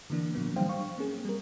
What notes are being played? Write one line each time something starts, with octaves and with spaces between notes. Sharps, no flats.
D3 E3 A#3 D4
A#2 F3 F#3 A#3 B3
E3 G3 D4 C5 F5 G5
F5 C#6
A#3 C4 C#4 G#4
G3 A#4